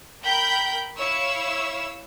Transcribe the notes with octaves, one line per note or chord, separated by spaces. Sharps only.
A#4 G5 B5 G6
E4 C#5 F5 E6